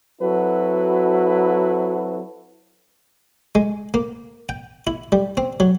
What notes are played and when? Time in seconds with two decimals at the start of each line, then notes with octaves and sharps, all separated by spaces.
0.21 F#3 C4 E4 F#4 A4 B4
3.55 G#3
3.94 A#3
4.49 G5
4.87 E4
5.12 G3
5.37 C4
5.60 F#3